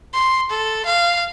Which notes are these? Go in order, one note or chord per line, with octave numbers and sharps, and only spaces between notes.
C6
A4
F5